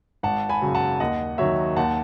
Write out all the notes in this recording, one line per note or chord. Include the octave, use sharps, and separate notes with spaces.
G#1 F#5 A5
G#5 B5
F#2 C#3 F#3
F#5 A5
D#2 D#5 F#5
D#3 F#3 C#5 E5
D#2 F#5 A5